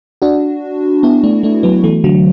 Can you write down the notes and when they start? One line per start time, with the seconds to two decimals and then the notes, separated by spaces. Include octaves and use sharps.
0.22 D4 F#4
1.03 B3 E4
1.24 A3 D4
1.43 A3 D4
1.63 F#3 B3
1.84 E3 A3
2.04 D3 F#3